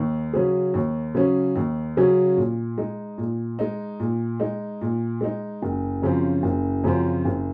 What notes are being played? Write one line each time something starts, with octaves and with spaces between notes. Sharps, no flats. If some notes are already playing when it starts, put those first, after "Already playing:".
Already playing: D#2
C#3 F#3 C#4 G#4
D#2
C#3 F#3 C#4 G#4
D#2
C#3 F#3 C#4 G#4
A#2
G#3 D#4
A#2
G#3 D#4
A#2
G#3 D#4
A#2
G#3 D#4
F#1
F#2 C#3 F3 C4
F#1
F#2 C#3 F3 C4
F#1